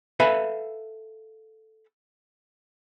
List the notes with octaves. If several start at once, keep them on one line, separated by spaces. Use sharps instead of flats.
A4 B4 E5 F5 G#5 B5